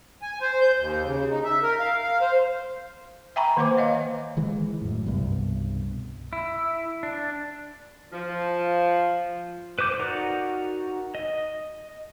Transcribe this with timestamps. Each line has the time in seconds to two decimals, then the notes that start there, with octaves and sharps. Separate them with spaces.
0.22 G#5
0.41 C5
0.61 G6
0.79 D#2
1.05 C#3
1.31 D#4
1.45 E5
1.63 A#4
1.80 F5
2.03 F5
2.21 C5
3.36 E5 G5 G#5 A#5 B5 C#6
3.57 D#3 A#3 B4 C5 D6
3.77 C#5 D#5 F5
4.37 D#3 E3 G#3
4.82 F#2 A2
5.06 C2 G2 B2
6.33 E4
7.03 D4
8.13 F3
9.79 B4 C5 D6 G6
9.99 D#4 F#4 A#4 D5
11.15 D#5